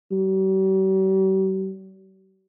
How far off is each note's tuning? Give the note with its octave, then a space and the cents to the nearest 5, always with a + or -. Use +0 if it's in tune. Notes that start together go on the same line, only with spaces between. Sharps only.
G3 -45